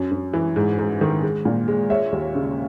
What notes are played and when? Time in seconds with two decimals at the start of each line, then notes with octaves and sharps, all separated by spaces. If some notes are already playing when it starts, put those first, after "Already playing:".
Already playing: F#2
0.11 F#2
0.34 E3
0.56 G#2
0.79 G#2
1.01 D#3
1.23 G#3
1.45 A#2
1.68 G#3
1.90 G#3 C#5 E5
2.12 D#2
2.35 C#3